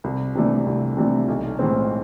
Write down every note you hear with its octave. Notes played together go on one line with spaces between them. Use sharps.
C2
C3 E3 A3 D4
C2
C3 E3 A3 D4
B1
A2 E3 G#3 C4